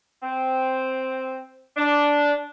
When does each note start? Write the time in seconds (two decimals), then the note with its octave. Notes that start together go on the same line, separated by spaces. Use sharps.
0.23 C4
1.76 D4